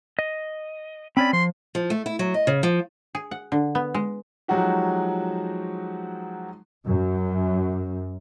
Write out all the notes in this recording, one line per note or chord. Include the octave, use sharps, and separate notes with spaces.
D#5
C4 C#4 D5 B5
F3 C6
F3
A3
E4
F#3
D#5
C#3
F3
G#4
F#5
D3
B3
G#3
F3 F#3 G#3 D#4 F#4 G4
F#2